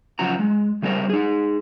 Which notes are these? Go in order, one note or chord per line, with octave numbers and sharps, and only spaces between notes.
C#3 F3 F#3 F#4 A#5
G#3
C#3 G3 C4 F#4 A#4 C5
D#4 G#4